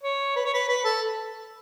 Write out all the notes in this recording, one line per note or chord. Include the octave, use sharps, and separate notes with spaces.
C#5
B4
C#5
B4
B4
A4